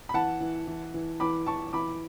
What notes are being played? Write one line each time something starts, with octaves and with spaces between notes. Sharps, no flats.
B5
E3 F#5 A5
E3
E3
E3
E3 B5 D6
E3 A5 C#6
E3 B5 D6